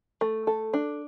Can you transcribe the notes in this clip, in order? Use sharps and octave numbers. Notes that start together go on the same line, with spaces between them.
A3
A4
D4